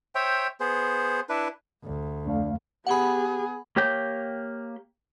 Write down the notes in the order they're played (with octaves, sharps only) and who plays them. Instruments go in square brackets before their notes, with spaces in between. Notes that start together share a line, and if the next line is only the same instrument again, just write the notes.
[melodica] C5 C#5 E5 G5
B3 G#4 C5
D4 E4 B4
[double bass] D2
[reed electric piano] F2 A3 F5 [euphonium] D4
[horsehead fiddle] B3 G#4 [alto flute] G4 [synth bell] F#5 B5
[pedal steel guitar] A#3 G4 C#5 G5 G6